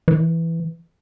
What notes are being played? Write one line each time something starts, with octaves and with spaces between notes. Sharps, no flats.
E3